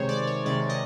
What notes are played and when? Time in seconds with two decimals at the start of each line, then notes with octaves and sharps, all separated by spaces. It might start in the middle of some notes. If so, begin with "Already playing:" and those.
Already playing: C3 D#3 G#3 C5 C#5
0.09 D5
0.27 C#5
0.45 C3 D#3 G#3 D5
0.70 D#5